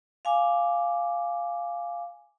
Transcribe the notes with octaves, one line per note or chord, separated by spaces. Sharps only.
F5 G#5 D6